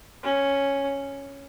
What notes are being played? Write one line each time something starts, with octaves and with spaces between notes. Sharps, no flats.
C#4